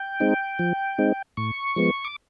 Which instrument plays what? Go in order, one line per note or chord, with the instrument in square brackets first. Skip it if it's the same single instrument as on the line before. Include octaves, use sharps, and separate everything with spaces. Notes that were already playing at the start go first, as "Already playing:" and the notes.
Already playing: [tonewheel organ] G5
G#3 C4 D#4
F3
G#3 C4 D#4
A2 C#6
F3 G#3 B3
D6